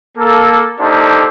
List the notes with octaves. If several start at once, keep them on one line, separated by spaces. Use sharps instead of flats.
A#3 A4
A#3 D4 D#4 G4 A4 C5